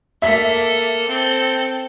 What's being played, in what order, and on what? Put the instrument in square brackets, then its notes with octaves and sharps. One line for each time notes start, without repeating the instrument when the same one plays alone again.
[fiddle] A#3 A4 [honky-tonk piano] E5 B6
[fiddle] C4 A4